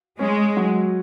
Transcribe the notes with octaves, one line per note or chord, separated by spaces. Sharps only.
G#3 C#4
F#3